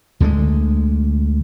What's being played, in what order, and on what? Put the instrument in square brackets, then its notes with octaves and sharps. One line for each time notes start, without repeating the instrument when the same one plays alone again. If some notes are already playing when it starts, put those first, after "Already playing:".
[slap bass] D2 D3 G3 G#3